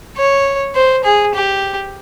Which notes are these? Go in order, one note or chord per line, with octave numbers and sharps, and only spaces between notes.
C#5
C5
G#4
G4